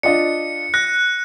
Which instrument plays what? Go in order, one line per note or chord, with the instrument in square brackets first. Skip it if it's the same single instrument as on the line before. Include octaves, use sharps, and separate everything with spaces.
[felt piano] D4 F4 D#5 [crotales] C#7
[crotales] F#6 [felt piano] A#6